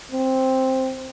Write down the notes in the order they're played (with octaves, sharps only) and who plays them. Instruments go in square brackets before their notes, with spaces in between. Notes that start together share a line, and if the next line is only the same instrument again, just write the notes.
[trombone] C4